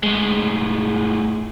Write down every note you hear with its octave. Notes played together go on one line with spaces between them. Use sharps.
A2 G#3